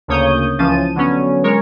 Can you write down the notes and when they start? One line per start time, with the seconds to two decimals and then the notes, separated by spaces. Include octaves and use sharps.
0.08 D2 C#3 A#3 C#5 D#6 G6
0.58 C#2 E3 F3 C#4 A5 D#7
0.96 D3 F#3 B3 C#4
1.44 G#3 A#4 C#5